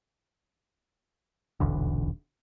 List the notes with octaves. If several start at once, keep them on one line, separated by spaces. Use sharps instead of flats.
D#1 B1 E2 D3